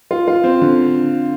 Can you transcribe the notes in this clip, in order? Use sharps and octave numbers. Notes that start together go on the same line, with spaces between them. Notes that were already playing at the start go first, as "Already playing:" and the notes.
F4
F4
C4
D3